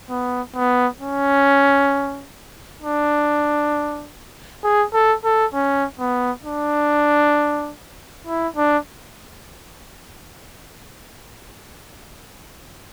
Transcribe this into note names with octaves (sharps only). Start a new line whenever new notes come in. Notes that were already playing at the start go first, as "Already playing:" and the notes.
B3
B3
C#4
D4
G#4
A4
A4
C#4
B3
D4
E4
D4